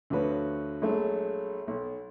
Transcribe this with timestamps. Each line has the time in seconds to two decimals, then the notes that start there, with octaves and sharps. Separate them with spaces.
0.10 D2 D3 F3 F#4 B4 C#5
0.82 A#1 F#3 G#3 A3
1.68 B1